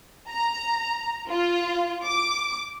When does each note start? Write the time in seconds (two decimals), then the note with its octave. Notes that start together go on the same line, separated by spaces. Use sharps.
0.28 A#5
1.29 F4
2.04 D6